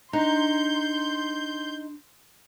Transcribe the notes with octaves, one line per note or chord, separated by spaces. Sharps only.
D4 D#4 A#5 C6 G6